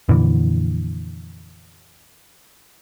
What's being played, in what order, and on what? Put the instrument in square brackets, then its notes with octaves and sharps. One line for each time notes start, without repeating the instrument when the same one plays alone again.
[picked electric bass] F2 A#2 D3 E3